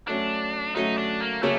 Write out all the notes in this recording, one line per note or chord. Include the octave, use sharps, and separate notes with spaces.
F#3 A3 C#4 D4
F#3 A3 C#4 D#4
D4
A#3
C#3 F#3 A3 A#3 C#4